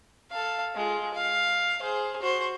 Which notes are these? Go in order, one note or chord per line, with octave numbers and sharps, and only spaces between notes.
A4 F5
G#3 F4
F5
G#4 C5
F#4 C5